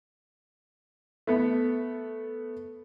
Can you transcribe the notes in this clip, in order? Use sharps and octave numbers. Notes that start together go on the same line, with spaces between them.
A3 B3